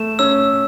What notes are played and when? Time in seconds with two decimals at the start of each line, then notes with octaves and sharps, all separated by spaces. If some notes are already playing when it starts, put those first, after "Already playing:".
Already playing: A3 E7
0.19 C#4 E6